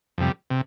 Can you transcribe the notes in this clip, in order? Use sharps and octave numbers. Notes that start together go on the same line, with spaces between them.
F2 C3 G3
C3